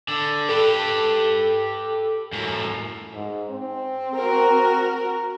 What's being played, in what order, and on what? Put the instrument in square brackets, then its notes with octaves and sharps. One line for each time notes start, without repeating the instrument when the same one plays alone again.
[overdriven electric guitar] D3
[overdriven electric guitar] G4 B4 [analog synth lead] A4
[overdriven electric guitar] F#2 A2
[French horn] G#2
C4
[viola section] F#4 A#4